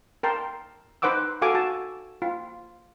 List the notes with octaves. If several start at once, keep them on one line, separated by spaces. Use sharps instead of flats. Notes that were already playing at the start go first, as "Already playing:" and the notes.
A#4 G5 A5 C6
D#4 B4 C5 F#5 D6 E6
F#4 A4 F5 G#5 D6
F#4 A5
F4